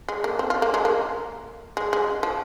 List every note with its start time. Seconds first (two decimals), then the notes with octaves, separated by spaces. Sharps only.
0.08 G#3
0.24 A#3
0.39 C4
0.50 F4
0.62 A#3
0.74 G#3
0.85 A#3
1.77 G#3
1.93 G#3
2.23 F3